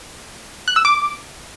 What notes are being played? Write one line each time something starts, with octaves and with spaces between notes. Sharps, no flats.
F#6
E6
D6